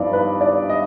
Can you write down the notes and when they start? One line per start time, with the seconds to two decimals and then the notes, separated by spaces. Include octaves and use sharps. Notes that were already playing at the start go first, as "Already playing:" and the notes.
Already playing: G2 F3 B3 D#4 D5
0.13 B4
0.41 D5
0.69 D#5